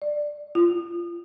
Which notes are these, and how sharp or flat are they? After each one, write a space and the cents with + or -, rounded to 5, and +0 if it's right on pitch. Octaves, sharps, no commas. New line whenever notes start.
D5 +10
F4 -25